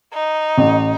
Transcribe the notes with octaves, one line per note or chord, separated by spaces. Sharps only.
D#4
A1